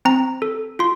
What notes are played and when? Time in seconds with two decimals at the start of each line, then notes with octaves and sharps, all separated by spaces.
0.05 C4 A#5
0.42 A4
0.79 F4 C6